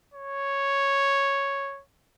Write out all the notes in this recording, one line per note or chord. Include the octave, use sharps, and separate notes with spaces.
C#5